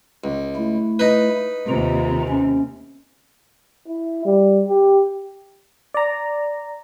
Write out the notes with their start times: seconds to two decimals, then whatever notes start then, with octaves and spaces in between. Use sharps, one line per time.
0.24 C#2
0.56 A3 E4
0.99 D#4 B4
1.69 D#2 C3 D#3 F4 A#5
2.28 C#4
3.88 E4
4.25 G3
4.68 G4
5.94 D5 A#5